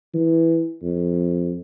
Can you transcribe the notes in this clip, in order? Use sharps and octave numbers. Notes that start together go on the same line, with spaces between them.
E3
F2